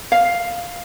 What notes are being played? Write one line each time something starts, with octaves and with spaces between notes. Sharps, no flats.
F5